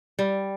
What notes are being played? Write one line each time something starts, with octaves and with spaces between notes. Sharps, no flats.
G3